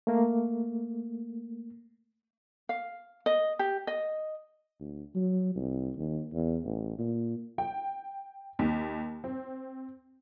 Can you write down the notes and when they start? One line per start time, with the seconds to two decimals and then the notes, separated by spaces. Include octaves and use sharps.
0.07 A3 A#3
2.69 F5
3.26 D#5
3.59 G4
3.87 D#5
4.80 D2
5.15 F#3
5.56 C2
5.97 D#2
6.34 E2
6.65 A1
6.99 A#2
7.58 G5
8.59 D#2
9.24 C4